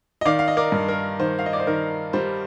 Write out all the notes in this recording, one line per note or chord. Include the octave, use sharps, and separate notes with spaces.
D#5
D#3 D5 F5
F5
D#5
A#4 D5
G2
A#4
D#3 C5
F5
D#5
D5
C5
D#3 A#4
G3 C5